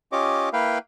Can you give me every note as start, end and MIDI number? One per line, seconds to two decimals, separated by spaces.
0.12 0.49 61
0.12 0.49 65
0.12 0.49 67
0.12 0.49 73
0.12 0.49 75
0.12 0.49 86
0.53 0.78 58
0.53 0.78 64
0.53 0.78 71
0.53 0.78 77
0.53 0.78 79